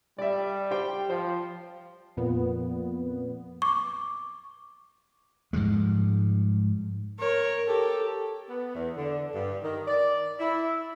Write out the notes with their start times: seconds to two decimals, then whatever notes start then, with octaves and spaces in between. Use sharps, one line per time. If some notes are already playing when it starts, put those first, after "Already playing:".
0.19 G3 D5 E5
0.71 G4 C5 G5
1.10 F3 C5
2.17 F2 A#2 B3
3.62 C#6 D6
5.53 G#2 F3 G3 G#3
7.20 A#4 C#5
7.67 G4 A4
8.49 B3
8.75 E2
8.97 D3
9.35 G2
9.63 D#3
9.87 D5
10.39 E4